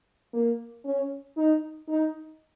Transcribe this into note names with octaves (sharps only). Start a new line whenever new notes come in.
A#3
C#4
D#4
D#4